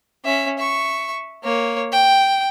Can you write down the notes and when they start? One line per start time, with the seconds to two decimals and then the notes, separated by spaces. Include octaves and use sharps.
0.25 C#4 E5
0.59 E5 C#6
1.43 A#3 C#5
1.92 G5